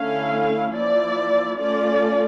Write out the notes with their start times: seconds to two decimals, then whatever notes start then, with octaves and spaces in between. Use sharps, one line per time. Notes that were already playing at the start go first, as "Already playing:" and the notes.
Already playing: D3 A3 C#4 E4 F5
0.73 F3 A#3 E4 D5
1.60 A3 C#4 F4 D5